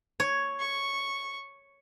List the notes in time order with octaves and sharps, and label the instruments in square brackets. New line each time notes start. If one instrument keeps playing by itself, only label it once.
[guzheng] C#5
[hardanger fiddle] C#6